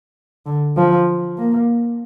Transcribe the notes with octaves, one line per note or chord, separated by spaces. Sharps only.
D3
F3
A#3